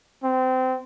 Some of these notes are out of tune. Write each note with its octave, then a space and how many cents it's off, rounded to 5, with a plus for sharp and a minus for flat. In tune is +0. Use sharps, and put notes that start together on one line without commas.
C4 -25